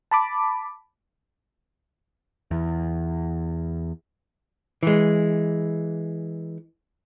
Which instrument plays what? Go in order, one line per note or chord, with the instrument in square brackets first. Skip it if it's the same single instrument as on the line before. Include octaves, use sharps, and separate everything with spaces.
[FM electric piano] A5 B5 D6
[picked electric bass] E2
[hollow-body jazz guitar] E3 G#3